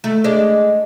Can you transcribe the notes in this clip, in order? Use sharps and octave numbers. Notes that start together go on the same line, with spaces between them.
A3
G#3 D4